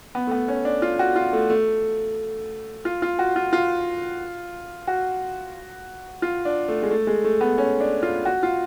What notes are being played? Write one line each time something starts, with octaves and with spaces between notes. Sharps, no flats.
B3
A3
B3
C#4
D4
F4
F#4
F4
A3
A3
F4
F4
F#4
F4
F4
F#4
F4
D4
A3
G#3
A3
G#3
A3
B3
C#4
D4
F4
F#4
F4